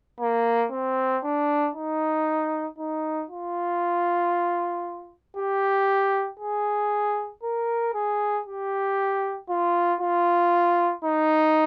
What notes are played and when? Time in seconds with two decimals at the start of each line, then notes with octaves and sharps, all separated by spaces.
0.20 A#3
0.72 C4
1.24 D4
1.75 D#4
2.78 D#4
3.30 F4
5.37 G4
6.39 G#4
7.43 A#4
7.94 G#4
8.46 G4
9.50 F4
10.01 F4
11.04 D#4